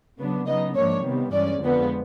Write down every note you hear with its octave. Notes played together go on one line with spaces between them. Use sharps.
C#3 F#3 B3 D4
C#3 F#3 B3 D#4 D#5
G#2 F3 A#3 D4 C#5
C3 D#3 G3 B3
G2 E3 G#3 C#4 D5
F2 D3 F3 G#3 B3